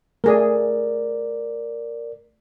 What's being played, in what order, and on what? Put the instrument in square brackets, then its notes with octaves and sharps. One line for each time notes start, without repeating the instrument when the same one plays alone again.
[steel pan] A3 G#4 [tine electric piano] A#4 D5